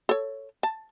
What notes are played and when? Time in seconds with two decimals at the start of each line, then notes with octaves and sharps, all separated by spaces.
0.09 A4 C#5
0.63 A5